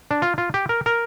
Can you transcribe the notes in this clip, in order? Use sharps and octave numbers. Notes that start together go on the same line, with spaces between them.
D4
F4
F4
G4
A#4
A#4